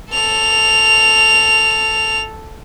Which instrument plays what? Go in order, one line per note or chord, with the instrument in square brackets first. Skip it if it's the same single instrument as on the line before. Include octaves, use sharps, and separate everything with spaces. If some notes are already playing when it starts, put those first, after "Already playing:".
[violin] A4 F7